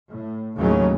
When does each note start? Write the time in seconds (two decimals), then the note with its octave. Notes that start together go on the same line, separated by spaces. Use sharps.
0.11 A2
0.56 D#2 A2 C#3 F#3 G#3 C#4